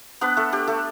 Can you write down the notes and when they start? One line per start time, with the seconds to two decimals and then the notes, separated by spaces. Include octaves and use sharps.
0.21 B3 D4 B4
0.37 A3 A4
0.52 D4 G4
0.67 A3 A4